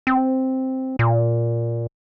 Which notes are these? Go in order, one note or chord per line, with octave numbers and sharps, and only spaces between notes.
C4
A#2